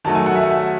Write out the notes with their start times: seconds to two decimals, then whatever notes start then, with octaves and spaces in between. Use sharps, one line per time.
0.04 D#3 F#3 A3 A5
0.15 G#5
0.26 F#5
0.36 E5